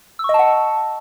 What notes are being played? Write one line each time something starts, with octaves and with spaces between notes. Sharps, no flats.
D#5 F#5 A5 C#6 E6